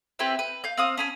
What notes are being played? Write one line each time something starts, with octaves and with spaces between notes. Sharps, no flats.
C4 E4 G4 B4
B4
F5 G6
C4 F5 D#6
C#4 G#5 B5